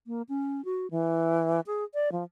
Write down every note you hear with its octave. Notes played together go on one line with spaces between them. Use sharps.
A#3
C#4
F#4
E3
G#4
D5
F3